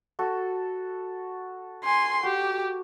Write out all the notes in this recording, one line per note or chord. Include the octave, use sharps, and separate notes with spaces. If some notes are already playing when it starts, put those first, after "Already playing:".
F#4 A4
G#5 C6
F#4 G4